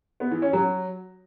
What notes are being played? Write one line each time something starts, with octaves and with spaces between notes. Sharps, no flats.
B3
E3
C#4
F#3